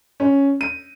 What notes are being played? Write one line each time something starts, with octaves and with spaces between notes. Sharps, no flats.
C#4
D#7